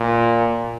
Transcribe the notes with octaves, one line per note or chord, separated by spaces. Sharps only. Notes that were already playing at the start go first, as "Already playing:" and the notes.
Already playing: A#2